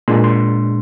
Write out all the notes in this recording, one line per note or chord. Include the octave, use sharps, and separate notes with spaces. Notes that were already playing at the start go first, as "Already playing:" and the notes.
A#2 G#3 D4 C6
C6